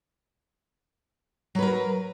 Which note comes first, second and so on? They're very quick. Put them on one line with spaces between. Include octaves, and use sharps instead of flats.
F#3 B4 A#4